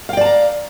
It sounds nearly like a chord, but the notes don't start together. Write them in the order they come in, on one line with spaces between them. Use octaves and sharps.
F5 G5 D5 A5 A#5